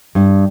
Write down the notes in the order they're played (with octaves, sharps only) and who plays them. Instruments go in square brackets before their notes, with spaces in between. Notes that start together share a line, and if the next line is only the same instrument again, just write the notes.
[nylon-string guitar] G2